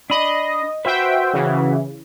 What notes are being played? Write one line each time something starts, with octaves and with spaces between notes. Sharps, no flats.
D4 D#5 B5
F#4 B4 C5 E5 G5
C#3 E3